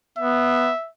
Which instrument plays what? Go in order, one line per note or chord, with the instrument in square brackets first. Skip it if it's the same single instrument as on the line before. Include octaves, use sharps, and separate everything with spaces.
[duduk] B3 [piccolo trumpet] E5